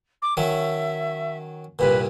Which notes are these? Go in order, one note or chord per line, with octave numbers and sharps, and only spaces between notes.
D6
D#3 F#3 C#4 E5
C2 G2 A#2 B4